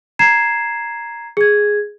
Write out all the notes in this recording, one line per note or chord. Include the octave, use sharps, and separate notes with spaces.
A#5 G#6 C7 E7
G#4 G#6